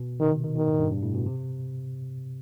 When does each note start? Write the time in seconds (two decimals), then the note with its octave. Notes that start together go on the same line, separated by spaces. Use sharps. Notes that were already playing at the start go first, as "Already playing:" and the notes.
Already playing: B2
0.20 C3 D#3
0.32 D#3
0.44 D#3
0.56 B2 D#3
0.67 A2
0.79 G2
0.91 G2
1.03 A2
1.14 B2
1.26 C3